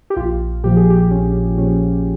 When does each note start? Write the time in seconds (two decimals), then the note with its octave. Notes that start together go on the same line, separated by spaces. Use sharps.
0.10 G4
0.16 A#1 F4
0.64 A#2 F3 G4
0.77 G#4
0.90 G4
1.11 A#1 C#4
1.58 A#2 F3 C#4